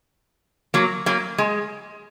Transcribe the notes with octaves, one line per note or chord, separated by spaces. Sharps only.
F#3 A#3
F#3 A#3
G#3